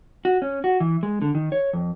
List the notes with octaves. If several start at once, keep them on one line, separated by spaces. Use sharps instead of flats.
F#4
C#4
F#4
E3
G#3
D3
D#3
C#5
F2